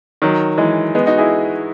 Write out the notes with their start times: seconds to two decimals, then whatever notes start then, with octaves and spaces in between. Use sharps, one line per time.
0.22 D#3 F#3
0.58 E3 G#3
0.95 G#3 B3
1.06 D#4 F#4
1.18 E4 G#4